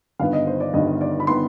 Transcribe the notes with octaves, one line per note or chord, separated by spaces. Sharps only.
G1 G2 D#3 B3 F5
D#5
C5
D5
G1 G2 D#3 B3 D#5
D5
B5
D#3 B3 C6